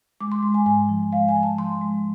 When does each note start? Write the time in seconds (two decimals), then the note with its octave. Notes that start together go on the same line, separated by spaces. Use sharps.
0.21 G#3 D6
0.32 C6
0.42 G#3
0.54 G#5
0.66 G#2 G#5
0.89 F3
1.12 G#3 F5
1.28 G#5
1.36 F3
1.43 A5
1.58 F3 C6
1.81 G#3